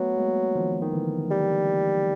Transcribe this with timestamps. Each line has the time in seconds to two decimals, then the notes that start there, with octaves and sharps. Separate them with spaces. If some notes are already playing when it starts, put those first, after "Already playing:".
Already playing: F#3 A3 B3
0.17 G#3 A#3
0.56 D#3 F3
0.82 D#3
0.93 D3 E3
1.31 G3